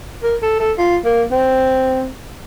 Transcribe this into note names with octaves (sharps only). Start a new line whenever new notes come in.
A#4
A4
A4
F4
A#3
C4